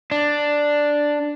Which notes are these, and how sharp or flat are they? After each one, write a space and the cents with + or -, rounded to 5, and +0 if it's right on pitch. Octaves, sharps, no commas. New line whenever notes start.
D4 +0